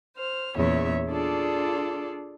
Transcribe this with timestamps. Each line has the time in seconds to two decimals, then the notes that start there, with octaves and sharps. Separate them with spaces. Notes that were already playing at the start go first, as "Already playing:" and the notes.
0.16 C5 F6
0.56 E2 A#2 C#3 C#5 E5
1.09 D4 F4 G#4 A4 D5